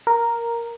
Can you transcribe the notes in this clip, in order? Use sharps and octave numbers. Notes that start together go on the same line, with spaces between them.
A#4